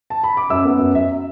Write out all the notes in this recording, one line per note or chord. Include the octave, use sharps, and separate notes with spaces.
A5
B5
D6
F#2 E5 E6
B3
F#2
F#2 E5